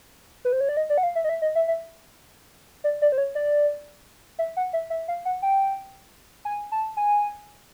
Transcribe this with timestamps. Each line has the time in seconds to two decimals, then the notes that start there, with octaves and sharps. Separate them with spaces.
0.45 B4
0.52 C5
0.61 C#5
0.69 D5
0.77 D#5
0.90 D5
0.98 F#5
1.03 F5
1.15 E5
1.24 D#5
1.29 E5
1.42 D#5
1.55 E5
1.68 E5
2.84 D5
3.02 D5
3.12 C5
3.18 C#5
3.35 D5
4.39 E5
4.57 F#5
4.73 E5
4.90 E5
5.08 F5
5.25 F#5
5.42 G5
6.45 G#5
6.72 A5
6.97 G#5